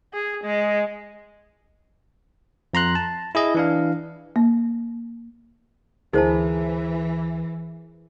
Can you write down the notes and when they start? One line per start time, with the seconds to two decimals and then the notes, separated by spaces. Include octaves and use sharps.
0.14 G#4
0.44 G#3
2.74 F2 A#5 C6 F#6
2.95 A5
3.35 E4 G#4 D#5
3.55 E3 D4 F5
4.36 A#3
6.13 D2 E3 D#4 E4 G#4 A#4 C5 A5